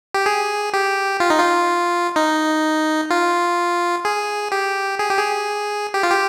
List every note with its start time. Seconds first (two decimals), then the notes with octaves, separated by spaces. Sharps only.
0.14 G4
0.26 G#4
0.73 G4
1.20 F4
1.30 D#4
1.40 F4
2.16 D#4
3.10 F4
4.05 G#4
4.52 G4
4.99 G#4
5.10 G4
5.19 G#4
5.94 G4
6.03 F4
6.12 G4